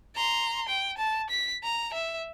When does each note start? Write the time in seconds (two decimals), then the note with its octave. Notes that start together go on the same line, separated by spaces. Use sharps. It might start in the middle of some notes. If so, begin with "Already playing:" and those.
0.15 A#5 C6
0.68 G5
0.98 A5
1.30 B6
1.63 A#5
1.94 E5